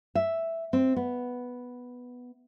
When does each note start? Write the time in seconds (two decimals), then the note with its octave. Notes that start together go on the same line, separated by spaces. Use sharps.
0.15 E5
0.73 C4
0.96 B3